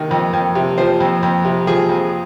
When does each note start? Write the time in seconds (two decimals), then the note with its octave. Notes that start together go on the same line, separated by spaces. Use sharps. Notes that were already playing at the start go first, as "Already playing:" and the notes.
Already playing: C3 D#3
0.11 F2
0.33 F2
0.55 C3
0.78 F3 C5
1.00 F2
1.23 F2
1.45 C3
1.67 F3 G#4
1.89 F2